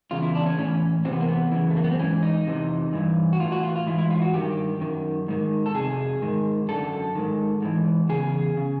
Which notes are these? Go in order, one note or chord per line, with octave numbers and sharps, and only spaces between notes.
E2 C#3 F4
E4
D4
C#4
A2 E3 C#4
E2 C3 E3 C4
B3
A#3
B3
F#2 C#3 E3
A3
A#3
B3
C4
G#2 E3 C#4
D#4
F2 C3 E3
G2 E3
F#4
A2 F4
E3
F#4
F4
F4
G#2 E3 E4
E4
F4
F#4
G2 D#3 G4
F#2 D#3
G#2 D#3
A4
F2 C3 G#4
G#2 D#3
F#2 D3 A4
G#2 D#3
G#2 E3
E2 C#3 G#4
C#3